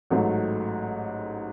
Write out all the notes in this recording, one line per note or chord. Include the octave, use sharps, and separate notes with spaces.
A1 G#2 F#3 A3